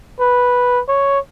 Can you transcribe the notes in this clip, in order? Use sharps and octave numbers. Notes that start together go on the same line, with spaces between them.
B4
C#5